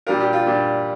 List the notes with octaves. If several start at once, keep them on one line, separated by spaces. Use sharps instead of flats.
A#2 G3 D4 F4 A#4
G4
F4
A#2 G3 D4 F4